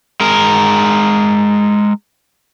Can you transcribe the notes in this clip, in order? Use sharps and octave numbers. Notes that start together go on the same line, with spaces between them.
G#3 A#4